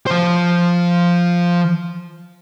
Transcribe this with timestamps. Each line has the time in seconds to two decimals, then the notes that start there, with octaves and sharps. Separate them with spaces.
0.07 F3 C5